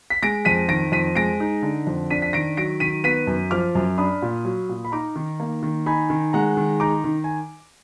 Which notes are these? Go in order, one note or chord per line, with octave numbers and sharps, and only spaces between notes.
B6
G#3 A#6 D7
F2 B6 D#7
D#3 A#6 D7
F2 B6 D#7
G#3 A#6 D7
D#4
D3
F2
D4 B6 D#7
B6
D#3 A#6 D7
F#3 A#6 D7
D#3 B6 D#7
B3 B6 D#7
F#2
F3 D6 F6
F#2
D4 B5 D#6
A#2
F#3
A#2
B5
D#4 A#5 D6
D#3
A#3
D#3
D#4 G#5 B5
D#3
G#3 F#5 A#5
D#3
D#4 A#5 D6
D#3
G#5